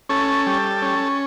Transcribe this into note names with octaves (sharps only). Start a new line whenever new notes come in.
C#4 A4
G3
C#4